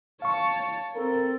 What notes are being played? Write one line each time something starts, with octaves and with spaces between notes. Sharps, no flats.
C#5 F5 A5 C#6
C4 A4 A#4